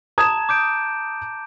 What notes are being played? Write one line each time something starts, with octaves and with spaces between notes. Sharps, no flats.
A5 A#5 D#6 G#6 E7
D6 G6 D7